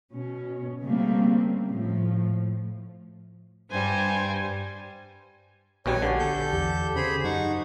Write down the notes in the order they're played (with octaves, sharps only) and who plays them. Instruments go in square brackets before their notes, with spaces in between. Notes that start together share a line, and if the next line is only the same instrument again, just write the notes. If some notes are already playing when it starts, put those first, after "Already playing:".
[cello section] B2 C#4
C#3 G3 A3 A#3 C4
A2 F3
[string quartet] G2 G3 [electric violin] C5 G#5
[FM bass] A#1 [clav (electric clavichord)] D#2 B2 G3 [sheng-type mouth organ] C#5 G#5
[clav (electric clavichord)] D3 [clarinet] G4
[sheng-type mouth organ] A4 G6
[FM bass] E2 [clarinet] G4
[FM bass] C#3 [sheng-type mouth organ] G#4 C5 B5
[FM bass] F#2 [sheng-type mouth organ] D#4 F#5 C#6